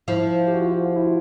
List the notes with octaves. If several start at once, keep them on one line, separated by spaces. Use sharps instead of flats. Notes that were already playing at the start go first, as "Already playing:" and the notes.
F3 E4
G4
F#4
F4
F#4
F#4
E4
F4